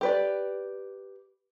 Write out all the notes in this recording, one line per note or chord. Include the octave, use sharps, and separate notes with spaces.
G4 B4 D5